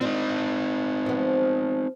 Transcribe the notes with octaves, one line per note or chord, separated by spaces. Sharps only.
C4 D4 D#4 F4
F3 B3